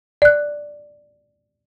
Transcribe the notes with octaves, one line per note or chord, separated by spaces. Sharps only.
D5 F#6